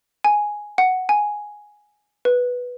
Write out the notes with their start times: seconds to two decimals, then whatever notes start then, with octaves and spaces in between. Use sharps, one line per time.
0.24 G#5
0.78 F#5
1.09 G#5
2.25 B4